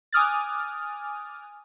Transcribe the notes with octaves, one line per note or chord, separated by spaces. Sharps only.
G#5 D6 D#6 F6 F#6 A6